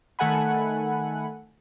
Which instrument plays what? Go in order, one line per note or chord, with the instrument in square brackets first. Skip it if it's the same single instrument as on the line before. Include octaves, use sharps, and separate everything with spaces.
[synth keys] D#3 A3 A4 F#5 G#5 B5